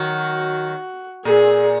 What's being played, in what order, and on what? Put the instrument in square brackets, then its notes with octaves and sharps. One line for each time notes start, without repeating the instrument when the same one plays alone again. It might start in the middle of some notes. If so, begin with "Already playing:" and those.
Already playing: [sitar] D#3 F#3 [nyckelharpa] F#4
[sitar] A#2 [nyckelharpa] G#4